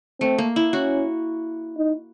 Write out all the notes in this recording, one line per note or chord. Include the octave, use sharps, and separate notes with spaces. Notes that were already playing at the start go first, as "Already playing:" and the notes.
A3 C4
A#3
E4
C#4 F#4
D#4